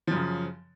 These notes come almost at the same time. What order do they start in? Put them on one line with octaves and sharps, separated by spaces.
F3 F#2 C#3